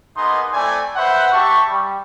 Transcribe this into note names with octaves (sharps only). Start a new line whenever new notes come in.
A#3 B3 D#4 G#4 D#5 C6
A3 C4 E4 D5 G#5
B4 C5 E5 F#5
G4 E5 A5 C#6
G3